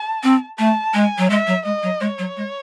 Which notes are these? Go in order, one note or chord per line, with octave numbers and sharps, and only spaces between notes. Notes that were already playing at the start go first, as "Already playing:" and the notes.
Already playing: A5
C4
A3 A5
G#3 G#5
F#3
G#3 E5
F#3
G#3 D#5
F#3
G#3 C#5
F#3
G#3